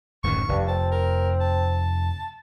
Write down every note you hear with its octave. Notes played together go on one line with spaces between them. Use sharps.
D1 F#2 D#3 C#6
F1 G2
C4 A5
A#4
A5